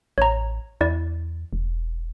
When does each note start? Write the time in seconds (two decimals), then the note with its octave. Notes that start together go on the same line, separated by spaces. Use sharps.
0.18 A1 C#5 A#5
0.81 E2 E4 D5
1.53 E1